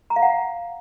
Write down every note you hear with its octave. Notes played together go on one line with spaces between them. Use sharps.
A#5
F5
F#5